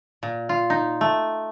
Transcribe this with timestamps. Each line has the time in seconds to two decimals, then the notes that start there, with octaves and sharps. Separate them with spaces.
0.23 A#2
0.49 F4
0.70 D#4
1.01 A3